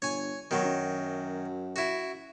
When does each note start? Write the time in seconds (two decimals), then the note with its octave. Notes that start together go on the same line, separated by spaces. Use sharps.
0.02 G1 C#5 G#5
0.51 B2 D#3 F#3
0.64 F#2
1.76 E4 F#4